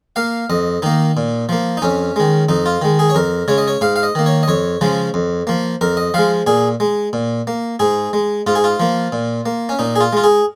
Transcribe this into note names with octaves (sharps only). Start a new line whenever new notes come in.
A#3 F5
F2 D#5
D#3 A#3 D#4
A#2
F3 A#3
D#4
F2 C#4
D#3 G#3
F2 D#4
F4
D#3 G#3
G#4
C#5
F2 A#4
C#3 G#3 C#5
D#5
C#5
G#2 F5
F5
D#5
D#3 A#3
C#5
D#5
F2 C#5
C#3 F3 G#3
F2
F3 A#3
F2 A#4
D#5
F3 G#3 F5
A#2 G#4
G#3
A#2
A#3
G#2 G#4
G#3
G#2 F4
G#4
F4
F3 A#3
A#2
A#3
C#4
A#2 D#4
G#4
F4
G#3 F4
G#4